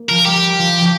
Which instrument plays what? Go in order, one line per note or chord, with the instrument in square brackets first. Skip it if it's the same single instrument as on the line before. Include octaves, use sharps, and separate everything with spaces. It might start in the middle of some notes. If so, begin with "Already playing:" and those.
Already playing: [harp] A#3
[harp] F3 [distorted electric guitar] A#4
[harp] G3 [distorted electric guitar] G4
[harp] F3
F3